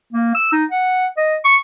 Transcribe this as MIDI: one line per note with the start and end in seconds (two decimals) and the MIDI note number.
0.13 0.31 58
0.35 0.50 88
0.52 0.65 63
0.72 1.06 78
1.17 1.36 75
1.45 1.56 85